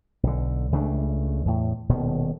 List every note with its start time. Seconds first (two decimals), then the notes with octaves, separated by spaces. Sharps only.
0.23 B1 D3
0.72 C#2 C#3 A3 D4
1.45 E2 A2
1.89 D#1 B2 D#3